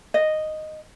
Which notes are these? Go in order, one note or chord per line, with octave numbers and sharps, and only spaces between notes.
D#5